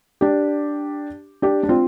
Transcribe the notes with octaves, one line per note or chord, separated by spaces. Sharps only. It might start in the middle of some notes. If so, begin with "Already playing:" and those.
D4 G4
D4 G4
D4
C4 F4